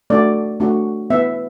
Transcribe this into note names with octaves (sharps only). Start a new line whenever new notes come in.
A3 D4 F#4 D5
A3 D4 F#4
B3 E4 E5